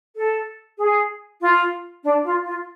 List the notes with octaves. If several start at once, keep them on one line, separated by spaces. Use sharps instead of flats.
A4
G#4
F4
D4
F4
F4